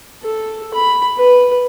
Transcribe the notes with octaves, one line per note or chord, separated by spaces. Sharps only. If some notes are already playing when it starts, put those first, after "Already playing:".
A4
B5
B4